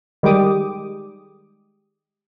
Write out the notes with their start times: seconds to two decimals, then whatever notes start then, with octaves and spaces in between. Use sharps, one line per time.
0.23 D#3 G3 G#3 G4 D6 D#6